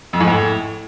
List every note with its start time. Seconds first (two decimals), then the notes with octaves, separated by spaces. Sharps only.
0.13 F2
0.20 G#2
0.28 A2